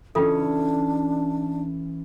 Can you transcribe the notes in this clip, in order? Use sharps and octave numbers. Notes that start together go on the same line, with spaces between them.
E3 C#4 D4 F4 A4